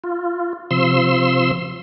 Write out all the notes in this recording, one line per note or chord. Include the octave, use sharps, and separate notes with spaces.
F4
C3 F3 C6 E6